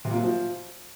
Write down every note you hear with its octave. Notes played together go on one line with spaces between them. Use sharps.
C3
A#2
F#3
F3